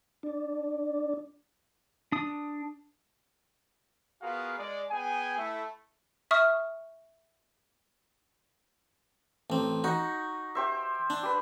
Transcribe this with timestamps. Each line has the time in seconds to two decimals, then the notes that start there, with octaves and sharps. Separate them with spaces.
0.23 D4
2.12 D4 D#6
4.22 B3 F4 F#4 G#4 A#4 F5
4.58 G#3 D5
4.91 B3 G#4 G5 G#5
5.37 A3 E4
6.31 E5 C#6 D#6 F6
9.50 A1 C4
9.84 D#4 F#4 C#6
10.55 G4 C5 E5
11.10 D4
11.23 G4 B4